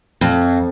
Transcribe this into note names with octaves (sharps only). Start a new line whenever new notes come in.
F2